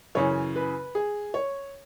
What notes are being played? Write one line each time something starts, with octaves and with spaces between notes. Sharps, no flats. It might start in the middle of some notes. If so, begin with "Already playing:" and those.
F#2 C#3 E3 C#5
B4
G#4
C#5